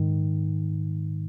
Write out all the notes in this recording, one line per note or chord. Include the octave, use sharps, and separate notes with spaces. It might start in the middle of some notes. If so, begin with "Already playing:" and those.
Already playing: G#2 D#3